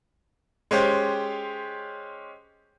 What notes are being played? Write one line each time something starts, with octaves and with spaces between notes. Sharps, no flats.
G#3 C#4 G4 C5